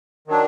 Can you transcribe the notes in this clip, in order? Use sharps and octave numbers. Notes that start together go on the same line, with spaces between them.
D#3 F#3 D4